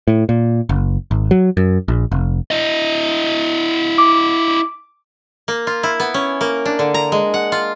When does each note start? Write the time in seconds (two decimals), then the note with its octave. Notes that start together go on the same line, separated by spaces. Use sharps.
0.08 A2
0.29 A#2
0.69 F#1
1.11 G#1
1.31 F#3
1.57 F#2
1.88 A#1
2.12 F1
2.51 E4 D#5
3.98 D6
5.48 A#3
5.67 F4
5.83 E4
6.00 B3
6.14 C#4
6.41 A#3
6.65 D4
6.79 D3
6.94 A#5
7.12 G#3
7.34 F#5
7.52 F4